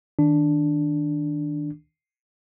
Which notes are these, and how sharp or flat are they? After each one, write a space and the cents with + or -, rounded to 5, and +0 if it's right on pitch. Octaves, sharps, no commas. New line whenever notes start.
D#3 +10 D4 +0